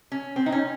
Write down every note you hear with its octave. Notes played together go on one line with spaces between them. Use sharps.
C#4
C4
D#4
C#4